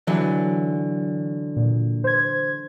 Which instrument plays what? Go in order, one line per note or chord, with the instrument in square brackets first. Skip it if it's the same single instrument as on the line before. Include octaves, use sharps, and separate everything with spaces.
[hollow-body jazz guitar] D3 E3 F#3
[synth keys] A#2
C5 G#6